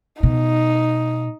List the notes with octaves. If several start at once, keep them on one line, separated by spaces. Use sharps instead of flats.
B2 D#4